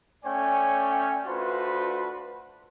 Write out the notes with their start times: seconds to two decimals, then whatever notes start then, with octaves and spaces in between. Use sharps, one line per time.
0.24 A3 C#4 C#5 D5 G5 G#5
1.26 A3 D4 F4 F#4 B4 C5